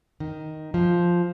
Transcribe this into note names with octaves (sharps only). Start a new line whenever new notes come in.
D#3
F3